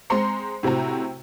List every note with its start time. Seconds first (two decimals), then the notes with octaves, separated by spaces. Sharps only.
0.10 G#3 C4 C5 A#5 C6 C#7
0.63 A2 C3 C4 F#4 A#5